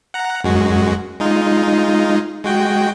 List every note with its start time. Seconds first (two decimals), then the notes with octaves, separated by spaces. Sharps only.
0.14 F#5 A#5
0.44 F#2 G#3 F#4
1.20 G#3 D#4 F4
2.44 G#3 F#4 G5